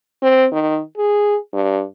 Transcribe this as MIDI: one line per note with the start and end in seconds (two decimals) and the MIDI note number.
0.22 0.46 60
0.52 0.80 51
0.97 1.36 68
1.53 1.83 43